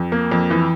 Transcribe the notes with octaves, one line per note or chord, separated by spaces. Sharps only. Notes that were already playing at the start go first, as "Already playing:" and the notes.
Already playing: F2
A#3
F2
E3